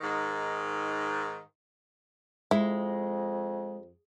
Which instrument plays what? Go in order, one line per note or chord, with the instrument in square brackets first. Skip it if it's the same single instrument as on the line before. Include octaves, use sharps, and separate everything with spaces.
[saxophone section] G#2 D#3
[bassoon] F2 [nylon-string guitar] G#3 [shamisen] E4